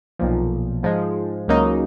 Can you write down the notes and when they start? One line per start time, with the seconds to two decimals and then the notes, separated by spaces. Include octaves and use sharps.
0.19 B1 A#2 F3
0.83 G#2 F3 G#3
1.48 C#2 C#3 F#3 A#3 D#4